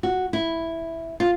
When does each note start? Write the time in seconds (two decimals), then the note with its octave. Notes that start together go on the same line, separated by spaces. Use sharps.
0.03 F#4
0.33 E4
1.20 F4